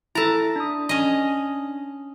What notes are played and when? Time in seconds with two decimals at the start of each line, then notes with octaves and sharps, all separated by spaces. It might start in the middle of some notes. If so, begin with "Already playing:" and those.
0.15 E4 A4 A5 A#5
0.56 D4 D#6
0.89 C#4 D#5